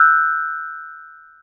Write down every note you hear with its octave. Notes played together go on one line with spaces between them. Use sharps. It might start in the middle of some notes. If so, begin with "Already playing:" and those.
Already playing: E6 F#6 G6